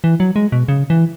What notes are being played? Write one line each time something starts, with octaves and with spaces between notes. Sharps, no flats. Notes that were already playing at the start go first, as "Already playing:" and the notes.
E3
F#3
G#3
B2
C#3
E3